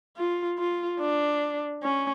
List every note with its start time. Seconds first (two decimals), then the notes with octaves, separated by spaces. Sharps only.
0.17 F4
0.59 F4
1.00 D4
1.83 C#4